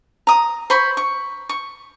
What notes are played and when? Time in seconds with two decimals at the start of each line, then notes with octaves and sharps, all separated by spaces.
0.27 A#5 D#6
0.70 C5 B5 C#6
0.97 C#6
1.49 C#6